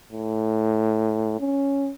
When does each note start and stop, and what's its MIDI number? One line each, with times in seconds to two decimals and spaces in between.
0.11 1.36 45
1.40 1.91 61